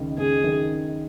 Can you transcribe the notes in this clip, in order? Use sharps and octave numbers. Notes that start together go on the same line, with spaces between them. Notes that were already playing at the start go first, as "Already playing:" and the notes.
Already playing: C#2 D#3
C#2 G#4
D#3